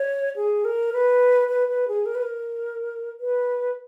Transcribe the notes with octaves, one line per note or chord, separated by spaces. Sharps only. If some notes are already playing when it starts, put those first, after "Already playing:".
Already playing: C#5
G#4
A#4
B4
B4
B4
G#4
A#4
B4
A#4
B4